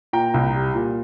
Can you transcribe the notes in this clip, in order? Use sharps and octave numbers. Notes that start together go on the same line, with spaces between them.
A#2 G5 A#5
C2
G3
A#2